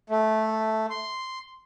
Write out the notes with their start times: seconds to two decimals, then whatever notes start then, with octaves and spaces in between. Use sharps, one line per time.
0.10 A3
0.90 C6